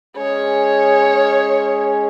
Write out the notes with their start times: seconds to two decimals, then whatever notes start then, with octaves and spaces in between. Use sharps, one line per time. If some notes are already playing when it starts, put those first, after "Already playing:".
0.17 G#3 C#4 G#4 C#5